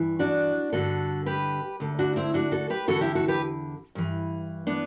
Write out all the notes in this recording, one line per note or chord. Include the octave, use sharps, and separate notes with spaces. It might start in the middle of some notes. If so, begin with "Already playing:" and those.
Already playing: G2 E3
D4 F#4
G2 D3 F#4 A4
G4 B4
D2 D3
D4 F#4
C4 E4
D4 F#4
F#4 A4
G4 B4
E2 D3 F#4 A4
E4 G4
F#4 A4
G4 B4
G2 E3
B3 D4